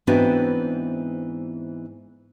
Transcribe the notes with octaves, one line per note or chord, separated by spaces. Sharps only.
G#2 E3 B3 C4 D4 F#4